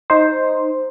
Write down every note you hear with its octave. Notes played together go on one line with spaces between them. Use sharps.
D#4 C5